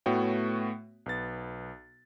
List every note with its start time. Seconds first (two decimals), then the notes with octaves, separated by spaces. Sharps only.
0.06 A2 A3 B3 F#4 C#5 G5
1.06 B1 B3 A6